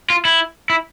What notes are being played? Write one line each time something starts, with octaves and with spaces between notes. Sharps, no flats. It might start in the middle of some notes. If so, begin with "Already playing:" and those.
F4
E4
E4